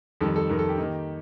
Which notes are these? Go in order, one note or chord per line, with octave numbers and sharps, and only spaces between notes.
F2 D#3 G3 A4
A4
F2 D#3 G3 A#4
A4
G4
D#3 A#3 D#4